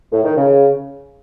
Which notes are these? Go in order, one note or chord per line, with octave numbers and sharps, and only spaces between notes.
A2
D#3
C#3